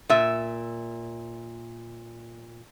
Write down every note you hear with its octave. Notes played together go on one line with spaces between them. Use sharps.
A#2 E5